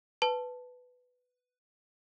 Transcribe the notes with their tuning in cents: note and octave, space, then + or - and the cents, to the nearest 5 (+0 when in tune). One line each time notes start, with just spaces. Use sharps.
B4 +10 A5 +0